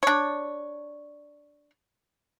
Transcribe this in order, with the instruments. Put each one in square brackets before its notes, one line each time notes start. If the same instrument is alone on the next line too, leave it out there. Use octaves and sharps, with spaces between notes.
[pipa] D4 C#5